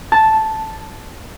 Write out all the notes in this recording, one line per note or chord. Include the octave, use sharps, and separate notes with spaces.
A5